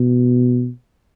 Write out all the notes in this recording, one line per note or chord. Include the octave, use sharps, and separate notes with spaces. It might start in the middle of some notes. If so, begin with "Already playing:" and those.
Already playing: B2